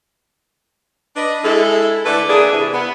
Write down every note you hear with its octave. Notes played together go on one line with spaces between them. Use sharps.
D4 B4 D#5
G#3 E4 A4
D3 A3 E4 A4 B4 D5
E3 A#3 D4 E4 G#4
C3 E3
B3